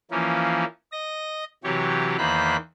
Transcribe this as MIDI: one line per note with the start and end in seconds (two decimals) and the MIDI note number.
0.11 0.64 52
0.11 0.64 53
0.11 0.64 58
0.11 0.64 61
0.92 1.44 75
0.92 1.44 94
1.64 2.17 48
1.64 2.17 52
1.64 2.17 54
1.64 2.17 67
1.64 2.17 73
2.18 2.56 40
2.18 2.56 51
2.18 2.56 58
2.18 2.56 72
2.18 2.56 83
2.18 2.56 90